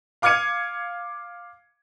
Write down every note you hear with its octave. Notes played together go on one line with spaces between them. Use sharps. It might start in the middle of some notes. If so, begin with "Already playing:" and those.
F5 D6 F6 G#6 C#7 D#7